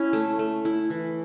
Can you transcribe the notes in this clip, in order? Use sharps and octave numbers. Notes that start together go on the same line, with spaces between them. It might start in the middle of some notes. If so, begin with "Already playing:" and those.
Already playing: C#4 E4
A3
A3
E4
E3